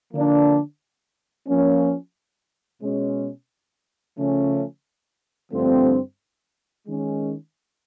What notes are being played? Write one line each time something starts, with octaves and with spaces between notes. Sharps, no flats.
D3 F3 A#3 D4
F3 A#3 C#4
B2 G#3 C#4
C#3 F3 A3 C#4
G2 D3 F3 A3 C4
D#3 G#3 C#4